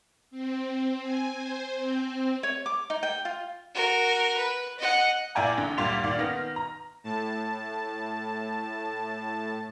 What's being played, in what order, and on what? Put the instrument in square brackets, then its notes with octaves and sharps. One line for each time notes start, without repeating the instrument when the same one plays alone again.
[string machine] C4
G#5
C5
C4
[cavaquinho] C#5
D6
D#4
G5
F4
[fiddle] F#4 A#4
B4
D#5 F#5
[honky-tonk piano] A#2 E4 D5 G5 G#5 A#5
A1 D3
D2 A#2 G3 F4 C6 F7
A#2 D#3 D5 F5
D#3 B3 F6 A#6
A#5
[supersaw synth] A2 A5